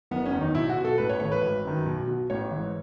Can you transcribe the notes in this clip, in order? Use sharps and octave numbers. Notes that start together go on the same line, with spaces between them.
F#1 B3
C#4
E2 D#3
D#4
B1 E4
F#4
B2
A4
A1 B4
C#5
A2 E3 C#5
B4
G#1
F#2 D#3
B1
B2
A1 C#5
E3
G#2